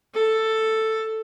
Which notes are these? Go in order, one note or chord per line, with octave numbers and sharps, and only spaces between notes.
A4